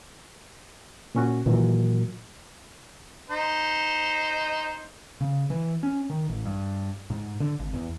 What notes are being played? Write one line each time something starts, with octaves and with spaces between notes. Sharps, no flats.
A#2 C#4 F#4
D#2 A#2 E3 F#3
D#4 C5
C#3
E3
C#4
D#3
A1
G2
G#2
D3
G#1
E2